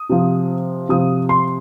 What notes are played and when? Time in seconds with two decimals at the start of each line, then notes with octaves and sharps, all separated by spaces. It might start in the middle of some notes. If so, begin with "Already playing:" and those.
Already playing: D#6
0.10 C3 F3
0.89 C3 F3 D#6
1.29 C6